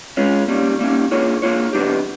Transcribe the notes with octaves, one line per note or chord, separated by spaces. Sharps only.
G#3 C#4 F4
G3 A#3 C#4
G3 A#3 C#4
A#3 D4 F4 G#4 C#5
A#3 D4 F4 G#4 C#5
D3 F#3 B3 D4 G4